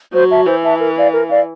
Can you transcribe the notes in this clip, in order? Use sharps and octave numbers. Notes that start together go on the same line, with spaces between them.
F#3 C5
E5 A5
E3 C5
E5 A5
A#4
D5 F5
A#4
D5 F5